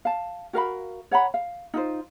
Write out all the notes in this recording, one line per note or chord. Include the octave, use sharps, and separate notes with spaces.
F5 A5
F#4 A#4 F5 B5
C#5 F#5 A#5 B5
F5
D#4 F4 C5